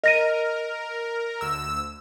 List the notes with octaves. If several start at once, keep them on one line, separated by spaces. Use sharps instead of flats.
A#4 D#5 A#6 D#7
D2 E6